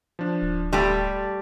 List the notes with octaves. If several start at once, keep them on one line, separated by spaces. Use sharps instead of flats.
F3 D4
D1
G3 A3 G4 A5 C6